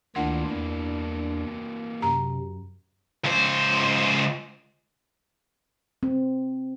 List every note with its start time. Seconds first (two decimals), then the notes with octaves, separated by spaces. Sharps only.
0.16 D2 D#3 E3 A#3 D4 F4 F#5
0.51 E2
2.02 F#2 C3 A#5
3.24 C#2 C5
6.03 C4